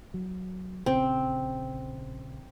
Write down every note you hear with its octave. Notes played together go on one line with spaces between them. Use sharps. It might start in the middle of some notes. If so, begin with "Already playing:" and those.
F#3
A#1 C#3 C4